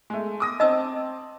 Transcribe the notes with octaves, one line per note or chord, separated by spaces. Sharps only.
G#3 A3
D6 D#6 A#6
C4 D#5 A5 E6